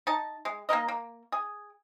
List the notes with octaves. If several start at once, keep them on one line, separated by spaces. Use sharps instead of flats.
D#4 A5
G#3
A#3 D#4 A#4 D#5
A#3
G#4